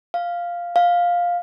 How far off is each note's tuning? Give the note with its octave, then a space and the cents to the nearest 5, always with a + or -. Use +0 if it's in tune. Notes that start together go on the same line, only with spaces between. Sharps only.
F5 +0
F5 +10